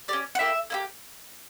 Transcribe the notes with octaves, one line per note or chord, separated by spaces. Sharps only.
C#4 G4 D5
F#5
A#3 E4 G4 E5
A#3 E4 G4